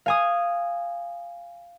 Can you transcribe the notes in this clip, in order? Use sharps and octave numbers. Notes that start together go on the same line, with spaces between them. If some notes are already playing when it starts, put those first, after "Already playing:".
F5 G#5 D#6